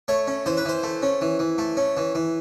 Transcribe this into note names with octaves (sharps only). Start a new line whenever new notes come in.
A3 C#5
C#4
E3 C5
B4
E3 C5
A3
C#4
E3
E3
A3
C#4
E3
E3